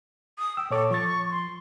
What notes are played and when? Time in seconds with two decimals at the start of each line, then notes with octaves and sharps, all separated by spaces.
0.39 D#6
0.57 G5 E6
0.71 A#2 A4 C#5 D6
0.91 F3 C#6 A6
1.31 C6